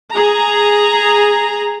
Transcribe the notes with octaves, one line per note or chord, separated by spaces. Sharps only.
G#4 A#5